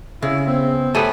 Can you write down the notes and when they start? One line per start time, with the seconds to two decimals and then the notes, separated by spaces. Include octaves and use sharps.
0.22 C#3 E4 G#4
0.47 B3 C4
0.95 A3 B3 G4 B4 C#5 G#5 A5